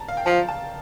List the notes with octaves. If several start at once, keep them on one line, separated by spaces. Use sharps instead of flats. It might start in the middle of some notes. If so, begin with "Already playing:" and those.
Already playing: A5 A#5
F5
G5
F3 A5
A5